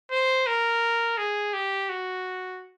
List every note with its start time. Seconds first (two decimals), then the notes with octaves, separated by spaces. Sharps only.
0.12 C5
0.47 A#4
1.18 G#4
1.54 G4
1.90 F#4